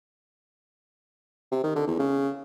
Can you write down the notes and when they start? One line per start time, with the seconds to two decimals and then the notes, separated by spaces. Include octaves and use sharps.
1.52 C3
1.64 D#3
1.76 D3
1.87 E2
1.99 C#3